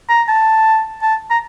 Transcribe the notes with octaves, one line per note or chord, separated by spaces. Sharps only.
A#5
A5
A5
A#5